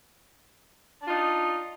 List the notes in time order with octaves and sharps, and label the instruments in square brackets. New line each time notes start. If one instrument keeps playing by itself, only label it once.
[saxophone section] D4
F4
D#4